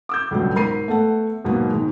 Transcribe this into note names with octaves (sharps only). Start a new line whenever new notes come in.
D6 E6 G6
C#2 G2 B2 D3 F#3 B3
G#2 A#4 B5 C7 D#7
A3 B3 A4 F#5
D#2 G#2 B2 F#3 A#3 B3
G#2 D#3 G#3